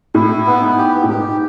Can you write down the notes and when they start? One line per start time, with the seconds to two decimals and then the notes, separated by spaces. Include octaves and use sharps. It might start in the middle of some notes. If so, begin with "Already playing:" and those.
0.15 A2 E4
0.47 B3
0.62 G#2
0.78 G4
1.04 A2
1.09 G#2 G4